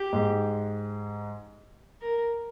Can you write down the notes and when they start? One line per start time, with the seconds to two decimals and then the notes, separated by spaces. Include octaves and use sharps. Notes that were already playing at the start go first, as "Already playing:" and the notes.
Already playing: G4
0.12 G#2 G#3
2.01 A#4